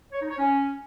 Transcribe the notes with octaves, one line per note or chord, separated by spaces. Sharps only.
C#5
D#4
C#5
C#4